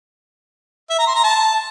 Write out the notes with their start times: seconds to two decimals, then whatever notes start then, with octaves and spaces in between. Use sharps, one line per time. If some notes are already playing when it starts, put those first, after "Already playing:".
0.90 E5
0.98 A#5
1.07 C6
1.15 A#5
1.24 A5